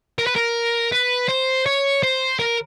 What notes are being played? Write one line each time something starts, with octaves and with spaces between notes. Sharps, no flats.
A#4
B4
A#4
B4
C5
C#5
C5
A#4